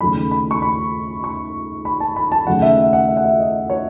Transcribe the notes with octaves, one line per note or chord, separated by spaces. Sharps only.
D#2 C#3 F#3 A3 B5
B5
C#6
B5
C#6
B5
A5
B5
A5
D#2 C#3 F#3 A3 F#5
E5
E5
F#5
E5
F#5
E5
D#5
C#5